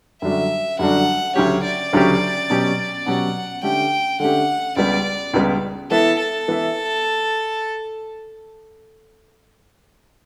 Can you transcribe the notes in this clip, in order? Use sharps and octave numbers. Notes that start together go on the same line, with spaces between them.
F#2 D3 G3 D4 F#4 E5
F#2 D3 G3 D4 F#4 F#5
D2 C#3 F#3 C#4 G4 C#5
D5
D2 C#3 F#3 C#4 G4
B2 F#3 C#4 G4
B2 F#3 C#4 G4 F#5
D3 A3 C#4 G4 G5
D3 A3 C#4 G4 F#5
C#2 C#3 G3 B3 D5
C#2 C#3 G3 B3
E3 B3 E4 A4
A4
E3 B3 E4